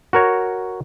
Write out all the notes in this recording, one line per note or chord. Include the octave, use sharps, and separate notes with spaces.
F#4 A#4 C#5